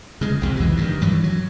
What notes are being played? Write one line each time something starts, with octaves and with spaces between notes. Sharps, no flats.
C#3 G#3
C2 F2 C3
E3 G#3
G2 D3 D#3
G2 E3 F#3
F#3